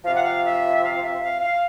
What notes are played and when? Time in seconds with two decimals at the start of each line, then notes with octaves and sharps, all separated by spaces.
0.03 C3 F3 F5
0.14 F#5
0.23 F5
0.43 E5
0.83 F5
1.02 E5
1.21 F5
1.41 F5